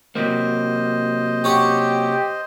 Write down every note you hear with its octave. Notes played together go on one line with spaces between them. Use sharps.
C3 F#3 A#3 C5 D#5
C#4 G4 C#5 F#5